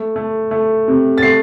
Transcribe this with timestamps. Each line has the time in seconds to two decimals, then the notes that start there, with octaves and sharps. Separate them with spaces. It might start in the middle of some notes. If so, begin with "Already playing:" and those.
Already playing: A3
0.16 A3
0.51 A3
0.88 C3
1.18 A6
1.23 A3 C7